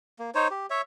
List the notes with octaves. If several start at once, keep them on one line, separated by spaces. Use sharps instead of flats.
A#3
D#4 C5 C#5
G4
C#5 E5